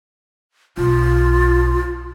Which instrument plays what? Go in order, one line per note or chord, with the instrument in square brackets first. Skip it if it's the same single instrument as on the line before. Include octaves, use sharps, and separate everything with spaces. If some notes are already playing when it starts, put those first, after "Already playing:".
[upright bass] B1 [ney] F4